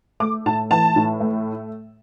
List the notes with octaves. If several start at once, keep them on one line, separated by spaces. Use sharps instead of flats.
A3 D6
A2 A5
E3 A5
A2
A3